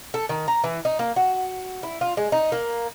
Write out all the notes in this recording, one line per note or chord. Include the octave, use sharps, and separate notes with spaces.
A4
D#3
A#5
E3
D#4
A#3
F#4
E4
F4
G#3
D#4
A#3